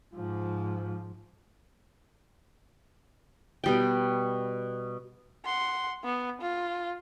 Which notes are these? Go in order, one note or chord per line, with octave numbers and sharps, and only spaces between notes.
G#2 F3
B2 G3 G5
F#5 C6
B3
F4